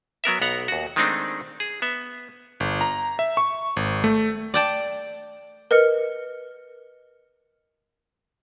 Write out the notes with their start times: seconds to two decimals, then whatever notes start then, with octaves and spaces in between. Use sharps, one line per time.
0.24 F#3 B3 A#4 E5
0.41 B1 B3 F#5 A#5
0.68 D#2 F#4
0.96 D#3 G#3 A3 C4 D4 D#4
1.60 G#4
1.82 B3 E5
2.60 G1
2.81 A#5
3.19 E5
3.37 C#6
3.76 G#1
4.04 A3
4.54 D5 G5 A5
5.71 A#4 B4 D#5 F6 C#7